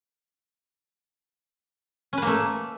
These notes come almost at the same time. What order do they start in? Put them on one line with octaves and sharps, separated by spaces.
C#4 B4 A#3 A3